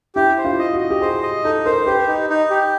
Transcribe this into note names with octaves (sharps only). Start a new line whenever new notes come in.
E4 G4
C5
F4
D#5
F#4
D#5
G4
G#4 C5
D#5
D#4 A4
A#4 C5
G4 B4
D#4
D#4
G4